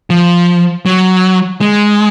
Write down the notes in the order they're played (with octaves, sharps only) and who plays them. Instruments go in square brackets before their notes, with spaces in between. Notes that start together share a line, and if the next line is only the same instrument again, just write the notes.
[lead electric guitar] F3
F#3
G#3